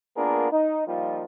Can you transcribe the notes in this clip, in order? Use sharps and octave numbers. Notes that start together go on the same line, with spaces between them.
A#3 B3 D4 F4 G#4 A#4
D#4
F3 G3 A#3 D#4 F4